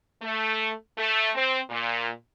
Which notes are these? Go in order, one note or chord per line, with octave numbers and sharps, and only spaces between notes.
A3
A3
C4
A#2